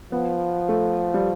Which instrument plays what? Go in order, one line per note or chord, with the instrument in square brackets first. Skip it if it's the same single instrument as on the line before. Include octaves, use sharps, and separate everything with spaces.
[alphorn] F3 [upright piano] B3
[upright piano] A3
G3